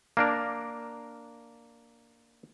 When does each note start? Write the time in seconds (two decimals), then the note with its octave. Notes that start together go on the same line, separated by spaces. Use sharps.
0.17 A#3 D4 A#4